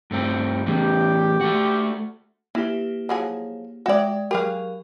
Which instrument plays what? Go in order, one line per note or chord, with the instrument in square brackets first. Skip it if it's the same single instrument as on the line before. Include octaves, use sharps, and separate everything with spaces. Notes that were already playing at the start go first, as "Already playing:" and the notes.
[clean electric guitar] G2 A3 C4
[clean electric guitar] E2 A2 E3 [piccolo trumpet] G4
[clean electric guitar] A3 F#4
[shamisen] E3 [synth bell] A#3 E4 G4
[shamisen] F3 F#3 G#4
[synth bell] G#3 E5 G5 [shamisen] F#4 D5
[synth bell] F#3 A#4 [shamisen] G4 G#4 F5